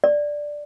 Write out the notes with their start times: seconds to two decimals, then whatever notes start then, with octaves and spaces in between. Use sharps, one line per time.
0.04 D5